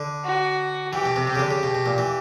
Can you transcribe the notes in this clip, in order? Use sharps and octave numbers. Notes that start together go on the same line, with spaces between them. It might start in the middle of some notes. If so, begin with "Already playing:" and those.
Already playing: D3
F#4
E3 G4
B2
C3
C3 G4
C#3
D3
C#3
B2
B2
A#2
E3